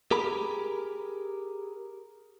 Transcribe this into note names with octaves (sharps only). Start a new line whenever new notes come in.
G4 G#4 A#4 B5